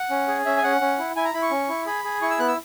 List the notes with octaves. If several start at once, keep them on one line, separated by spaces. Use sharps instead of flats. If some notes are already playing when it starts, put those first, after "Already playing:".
Already playing: F#5
C#4
G#4
C#4 E5
G#5
C#4 F#5
C#4
E4
E4 G#5
A#5
E4 B5
C#6
C#4
E4
G#4 B5
G#4
E4 C#6
E6
B3 F#6
E6